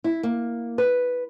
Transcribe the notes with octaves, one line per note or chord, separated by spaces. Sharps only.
E4
A#3
B4